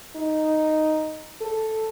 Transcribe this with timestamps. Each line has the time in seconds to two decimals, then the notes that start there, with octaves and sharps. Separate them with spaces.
0.16 D#4
1.41 A4